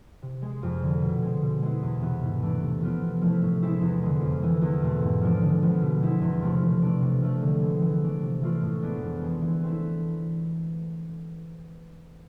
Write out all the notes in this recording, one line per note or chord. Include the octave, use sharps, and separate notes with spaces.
C3
G#3 C4
F2
D3 F3
B2
G#3 C4
B2
G#3 B3 E4
E2
C3 E3 B3
G#2
E3 A3 D4
C3
F3 B3 D4 F4
C3
F3 A3 E4
A2
G#3 C4 E4
E2
D3 G#3
F2
E3 G#3
E2
B2 A3 C4
G#2
F3 G#3 D4
D3
F3 G#3 B3
B2
G#3 C4 E4
E2
C3 F3 A3 C4
E3
A3 D4
C3
F3 A3
D3
G#3 B3
E3
A3 D4
C3
E3 A3 D4 F4
A2
G#3 B3 D4
F2
E3 G#3 C4
E3
A3 C4 E4